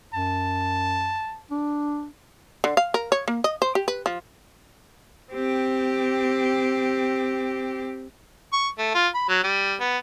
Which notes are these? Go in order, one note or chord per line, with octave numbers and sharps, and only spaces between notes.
F#2 A5
D4
D3
F5
A#4
C#5
A#3
D#5
C5
G4
B4
F3
C4 G4
C#6
A3
F4
B5
F#3
G3
B3